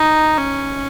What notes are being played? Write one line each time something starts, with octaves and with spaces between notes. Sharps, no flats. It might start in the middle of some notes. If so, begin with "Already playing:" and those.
Already playing: D#4
C#4